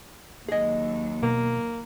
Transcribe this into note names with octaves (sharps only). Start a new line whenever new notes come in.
D#2 F#3 G#4 D#5
B2 A#3